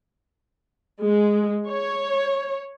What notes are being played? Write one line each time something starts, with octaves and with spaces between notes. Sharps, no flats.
G#3
C#5